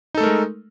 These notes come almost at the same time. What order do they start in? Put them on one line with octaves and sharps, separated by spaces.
D#4 A4 A3 A#4 G#3